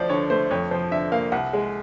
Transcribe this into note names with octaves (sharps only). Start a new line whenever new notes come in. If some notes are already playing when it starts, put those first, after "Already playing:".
Already playing: D2 F3 C5 D5
D3 C#5
A3 C5
F2 C#5
F3 C5
D3 E5
A#3 F5
C2 F#5
G#3